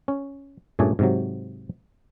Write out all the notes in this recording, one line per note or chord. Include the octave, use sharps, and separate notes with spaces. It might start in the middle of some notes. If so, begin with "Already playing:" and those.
C#4
G2 A#2 A3 C#4 G#4 D5
G#2 C3 F#3